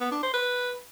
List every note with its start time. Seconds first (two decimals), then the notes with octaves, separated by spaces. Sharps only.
0.01 B3
0.12 D4
0.23 C5
0.34 B4